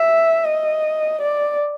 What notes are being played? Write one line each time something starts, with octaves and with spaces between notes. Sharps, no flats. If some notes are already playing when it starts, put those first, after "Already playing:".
Already playing: E5
D#5
D5